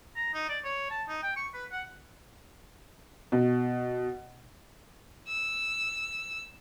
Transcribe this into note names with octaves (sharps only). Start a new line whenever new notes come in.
A#5
D#4
D5
C#5
A5
D#4
G5
C#6
B4
F#5
B2
E6